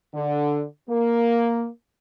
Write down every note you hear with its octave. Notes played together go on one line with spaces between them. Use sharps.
D3
A#3